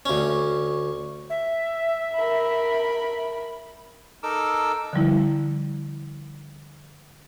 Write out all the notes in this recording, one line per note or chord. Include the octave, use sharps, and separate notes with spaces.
D2 C#4
E5
A#4 B5
D#4 A4 A#4 D6 E6
D3 F3 G3 E4